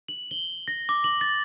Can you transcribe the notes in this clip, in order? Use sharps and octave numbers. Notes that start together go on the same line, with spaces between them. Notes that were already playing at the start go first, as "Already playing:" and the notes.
F#7
G7
A#6
D6
F#7
A6